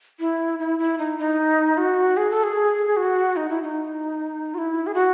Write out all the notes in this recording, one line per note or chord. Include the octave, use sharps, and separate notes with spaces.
E4
E4
E4
D#4
D#4
F#4
G#4
A4
G#4
F#4
D#4
E4
D#4
F#4
E4
G#4
F#4